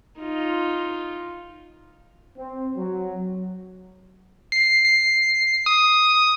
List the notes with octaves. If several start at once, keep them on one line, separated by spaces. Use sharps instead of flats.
D#4 F4
C4
F#3
C7
C7
D#6